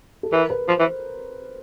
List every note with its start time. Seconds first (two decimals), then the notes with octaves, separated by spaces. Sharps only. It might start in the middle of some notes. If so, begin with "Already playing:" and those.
0.23 A4
0.32 E3 A#4
0.50 B4
0.68 F3 C5
0.79 E3